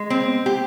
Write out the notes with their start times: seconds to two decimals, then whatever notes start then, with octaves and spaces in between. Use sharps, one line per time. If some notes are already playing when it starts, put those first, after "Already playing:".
Already playing: G#3
0.10 C4
0.46 G4